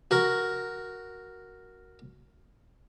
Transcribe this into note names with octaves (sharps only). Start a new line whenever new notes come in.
F#4 A#4